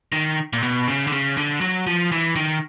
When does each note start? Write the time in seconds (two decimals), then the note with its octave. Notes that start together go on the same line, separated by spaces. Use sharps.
0.12 D#3
0.53 A#2
0.63 B2
0.88 C#3
1.07 D3
1.12 C#3
1.37 D3
1.61 F#3
1.87 F3
2.12 E3
2.36 D#3